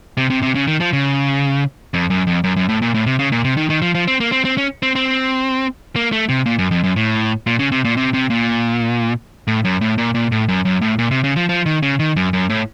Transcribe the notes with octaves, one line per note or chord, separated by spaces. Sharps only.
C3
C3
C3
C#3
D#3
F3
C#3
F2
F#2
F2
F#2
F#2
A2
A#2
A2
C3
C#3
A#2
C3
D#3
D#3
F3
F3
C4
A#3
C4
C4
C#4
C4
C4
A#3
A3
C3
A#2
F#2
F2
F#2
A2
A#2
C#3
C3
A#2
C3
C3
A#2
A2
F#2
A2
A#2
A#2
A2
F#2
F#2
A2
A#2
C3
C#3
F3
F3
D#3
C#3
D#3
F#2
F#2
A2